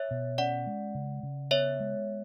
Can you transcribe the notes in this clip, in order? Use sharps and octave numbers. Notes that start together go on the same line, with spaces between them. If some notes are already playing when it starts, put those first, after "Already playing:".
Already playing: C#5 E5
B2
C#4 D5 F#5
G#3
C#3
C#3
B3 C#5 E5
G#3